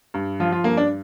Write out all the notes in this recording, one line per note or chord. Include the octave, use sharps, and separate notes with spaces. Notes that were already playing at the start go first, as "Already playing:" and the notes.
G2
F3 F4
F4
G2 A#3
D4